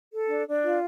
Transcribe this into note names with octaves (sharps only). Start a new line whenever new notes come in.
A4
D4
D4
F4